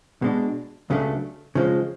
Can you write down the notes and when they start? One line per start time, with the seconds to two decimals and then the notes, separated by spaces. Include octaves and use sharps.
0.22 B2 G#3 D4
0.90 C#2 C#3 F#3 A3 D4
1.55 C#3 F3 G#3